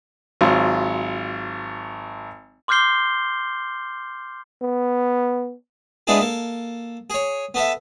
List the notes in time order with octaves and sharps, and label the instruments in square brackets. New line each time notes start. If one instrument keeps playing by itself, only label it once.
[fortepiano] G#1 F#3 F4
[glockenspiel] C6 D6 F6 G6 C7 G7
[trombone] B3
[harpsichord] G#3 B3 D4 E4 G#4 A4
A#3 A4
G#4 C#5
B3 A4 E5